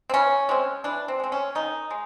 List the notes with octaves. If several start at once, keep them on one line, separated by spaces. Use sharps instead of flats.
C4
E3 C#4
G#3 C4
E3 D4
C4
G#3 C4
C#4
D#3 D#4
G#3